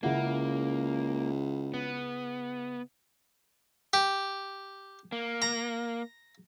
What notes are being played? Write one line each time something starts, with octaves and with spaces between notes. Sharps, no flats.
C#2 C#3 A#3 E4 F#5
B3
G4
A#3
A#5